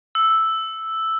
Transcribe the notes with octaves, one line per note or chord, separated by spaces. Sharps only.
E6